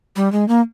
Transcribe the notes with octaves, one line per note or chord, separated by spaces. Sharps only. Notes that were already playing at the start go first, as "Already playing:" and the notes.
G3
G#3
A#3